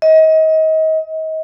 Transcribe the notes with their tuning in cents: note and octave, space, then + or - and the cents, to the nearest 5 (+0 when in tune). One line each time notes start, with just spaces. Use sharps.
D#5 +30